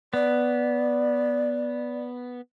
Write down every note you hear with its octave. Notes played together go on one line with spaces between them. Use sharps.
B3 D5